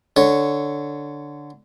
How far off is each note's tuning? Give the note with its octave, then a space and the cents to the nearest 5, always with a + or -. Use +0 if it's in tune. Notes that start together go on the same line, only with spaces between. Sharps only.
D3 +0 C#5 +0